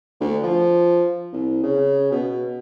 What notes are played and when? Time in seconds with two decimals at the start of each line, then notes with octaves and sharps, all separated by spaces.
0.20 D2
0.43 F3
1.33 C2
1.63 C#3
2.11 B2